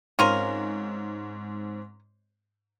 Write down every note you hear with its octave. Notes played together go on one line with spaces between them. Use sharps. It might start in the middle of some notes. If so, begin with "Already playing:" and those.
G#2 C4 C#4 F4 A#4 C#5